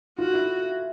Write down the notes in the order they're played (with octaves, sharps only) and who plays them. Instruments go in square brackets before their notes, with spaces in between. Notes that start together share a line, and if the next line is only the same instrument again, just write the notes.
[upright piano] F4 [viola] F#4
[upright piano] E4